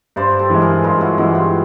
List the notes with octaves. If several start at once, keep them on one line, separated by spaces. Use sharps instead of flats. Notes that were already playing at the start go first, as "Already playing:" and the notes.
G2 C5 D5
G4 A4
E3 G#3
G#4 A#4
G2 D#4 F4
E4 F#4
E3 G#3 E4 F#4
F4 G4